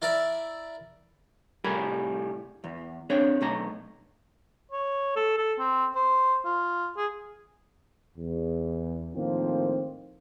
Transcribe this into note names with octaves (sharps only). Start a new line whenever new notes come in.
E4 A#4 D5 E5
C2 A2 G3 G#4 A#4 B5
E2
C4 D4 G#4 C#5
B1 A3 A#5
C#5
A4
A4
C4
C5
F4
G#4
E2
A2 D#3 F3 A#3 C4